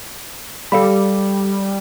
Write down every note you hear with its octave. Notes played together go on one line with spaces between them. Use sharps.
G3 A4 F5 B5